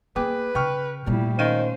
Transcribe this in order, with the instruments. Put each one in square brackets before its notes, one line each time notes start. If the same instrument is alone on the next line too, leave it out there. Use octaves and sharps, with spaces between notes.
[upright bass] A#3 [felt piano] G#4 G5 D6 [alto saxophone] B4
[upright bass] C#3 [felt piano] G5 C#6 F6
[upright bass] A#2 A3 [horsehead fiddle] G3 E4
[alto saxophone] D#3 [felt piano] C#4 F5 D#7 [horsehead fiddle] C5